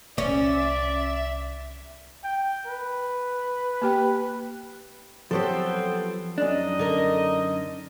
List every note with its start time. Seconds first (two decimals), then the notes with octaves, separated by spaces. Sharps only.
0.18 C2 D3 C#4 D5 E5
2.24 G5
2.67 B4
3.82 A#3 G4 G5
5.31 F3 F#3 B3 C4 G4 A4 C5
6.38 F#2 D4 D#4 D#5
6.79 D3 A#4